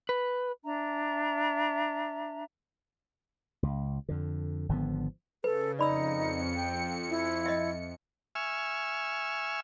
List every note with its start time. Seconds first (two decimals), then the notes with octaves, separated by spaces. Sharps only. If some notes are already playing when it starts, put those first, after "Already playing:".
0.09 B4
0.63 D4 E5 A#5
3.63 C#2
4.09 F2 D3
4.69 G#1 D3 F3 B3
5.44 C#3 A4 B4
5.79 F2 D#4 D5 B5 E6 C#7
6.56 G5
7.09 E4
7.46 D#5 E5
8.35 E5 G#5 C#6 E6 F6